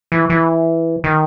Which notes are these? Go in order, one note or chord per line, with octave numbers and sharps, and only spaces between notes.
E3
E3
D#3